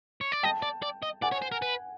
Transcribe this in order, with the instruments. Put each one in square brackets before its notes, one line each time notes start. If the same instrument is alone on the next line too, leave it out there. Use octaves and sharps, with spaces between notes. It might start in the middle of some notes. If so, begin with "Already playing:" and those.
[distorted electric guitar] C#5
D5
[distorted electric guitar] D#5 [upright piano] G5 A5
[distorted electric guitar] D5
D5
D#5
[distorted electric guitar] D5 [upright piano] F#5 G#5
[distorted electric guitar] C#5
C5
A#4
B4